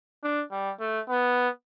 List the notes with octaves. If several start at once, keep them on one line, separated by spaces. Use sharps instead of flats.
D4
G3
A3
B3